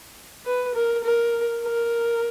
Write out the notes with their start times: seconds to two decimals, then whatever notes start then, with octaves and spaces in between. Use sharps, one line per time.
0.45 B4
0.75 A#4
1.04 A#4
1.64 A#4